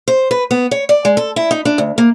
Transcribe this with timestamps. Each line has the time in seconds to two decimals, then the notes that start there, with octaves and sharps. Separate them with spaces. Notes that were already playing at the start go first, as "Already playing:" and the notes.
0.08 C5
0.31 B4
0.51 B3
0.71 C#5
0.89 D5
1.05 G#3
1.17 A4
1.36 E4
1.51 D#4
1.65 D4
1.78 D2
1.98 A#3